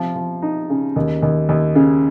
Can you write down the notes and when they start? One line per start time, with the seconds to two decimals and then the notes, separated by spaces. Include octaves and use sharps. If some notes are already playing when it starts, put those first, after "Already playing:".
Already playing: C3 F3
0.16 F3
0.42 D#4
0.70 C#3
0.96 D#2
1.22 D#2
1.49 D#2
1.75 C#3